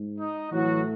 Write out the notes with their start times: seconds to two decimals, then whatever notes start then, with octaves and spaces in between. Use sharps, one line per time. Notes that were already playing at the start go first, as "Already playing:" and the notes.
Already playing: G#2
0.18 D#4 D#5
0.51 A2 E3 F#3 A3 F#4